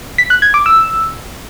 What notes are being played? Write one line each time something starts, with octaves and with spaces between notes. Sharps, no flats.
B6
F#6
G#6
D6
E6